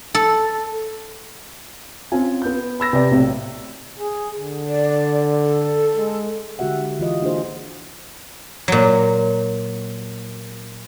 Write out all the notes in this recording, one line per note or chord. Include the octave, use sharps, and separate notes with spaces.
A4
C4 C#4 F4 G#5
B3 G6
B5 E6 A#6
C3 B4 D5
B1 A2 C4
G#4
D3
D5
A4
G#3
D3 G#3 F#4 G4 E5 F#5
E3 F4 D#5
A#3 D4 F4 F#4 G#4 C5
A#2 F#3